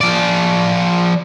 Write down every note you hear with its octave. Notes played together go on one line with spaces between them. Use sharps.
F3 D5